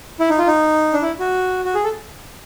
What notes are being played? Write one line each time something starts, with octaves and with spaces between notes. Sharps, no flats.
E4
D#4
F4
D#4
D4
E4
F#4
F#4
G#4
A4